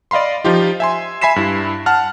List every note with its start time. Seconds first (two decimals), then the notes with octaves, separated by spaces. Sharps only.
0.11 D5 D#5 F5 B5 C6
0.45 F3 D#4 F4 G4
0.80 E5 G#5 C6
1.21 E5 G#5 B5 B6 C7 E7
1.36 G2 E4
1.86 F#5 A5 F6